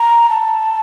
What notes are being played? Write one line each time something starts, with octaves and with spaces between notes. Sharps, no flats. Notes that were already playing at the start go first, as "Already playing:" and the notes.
Already playing: A#5
A5